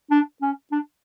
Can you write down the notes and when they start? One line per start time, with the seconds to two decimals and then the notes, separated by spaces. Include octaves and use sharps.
0.11 D4
0.41 C#4
0.72 D4